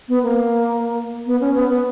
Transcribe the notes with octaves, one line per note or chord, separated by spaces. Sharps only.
B3
A#3
B3
C#4
B3
B3